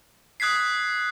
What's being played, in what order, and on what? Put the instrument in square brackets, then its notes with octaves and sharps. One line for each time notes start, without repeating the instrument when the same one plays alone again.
[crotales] D#6 F#6 G#6 B6 C7